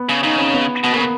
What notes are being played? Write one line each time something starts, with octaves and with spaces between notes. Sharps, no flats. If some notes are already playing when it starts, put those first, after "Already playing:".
Already playing: B3
C#3
C#3 D#4
C#4
B3
B2 B3
C#3 A#3
B3